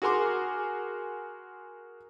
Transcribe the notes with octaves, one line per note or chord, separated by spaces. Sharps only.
F#4 G#4 A#4 C6 D6